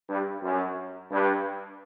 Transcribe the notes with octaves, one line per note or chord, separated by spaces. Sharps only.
G2
F#2
G2